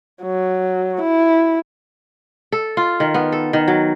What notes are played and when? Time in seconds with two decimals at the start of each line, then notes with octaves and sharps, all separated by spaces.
0.22 F#3
1.01 E4
2.52 A4
2.77 F4
3.00 D#3
3.14 B3
3.32 A4
3.53 D#3
3.68 F#3